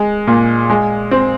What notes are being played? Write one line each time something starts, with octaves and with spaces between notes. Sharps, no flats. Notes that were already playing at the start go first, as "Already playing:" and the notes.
Already playing: G#3
A#2
G#3
C4